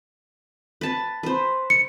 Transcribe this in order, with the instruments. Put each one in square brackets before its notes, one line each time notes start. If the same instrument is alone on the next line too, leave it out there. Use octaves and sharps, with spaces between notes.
[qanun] B4 A5
B4 C5
[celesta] C#7